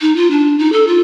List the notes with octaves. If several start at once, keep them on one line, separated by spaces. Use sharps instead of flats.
D#4
F4
D4
D#4
A4
F4